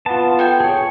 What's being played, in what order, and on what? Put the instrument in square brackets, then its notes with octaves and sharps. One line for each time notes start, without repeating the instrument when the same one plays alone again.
[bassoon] B3 [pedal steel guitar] F4 A5
[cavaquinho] A4 G5 G#5
[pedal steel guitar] G#4 C#5